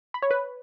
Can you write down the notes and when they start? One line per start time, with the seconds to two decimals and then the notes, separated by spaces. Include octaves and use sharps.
0.14 B5
0.22 C#5
0.31 B4